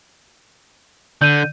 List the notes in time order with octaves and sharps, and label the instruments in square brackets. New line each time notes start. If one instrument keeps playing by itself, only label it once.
[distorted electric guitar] D3 [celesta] G6 D#7